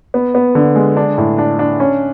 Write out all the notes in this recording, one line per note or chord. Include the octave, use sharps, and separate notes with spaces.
B3
B3
D3
G#3
D4
A2
D4
D4
C#4